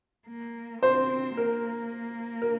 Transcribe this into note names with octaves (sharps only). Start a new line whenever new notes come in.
A#3
C4 C5
A#3 A#4
A#4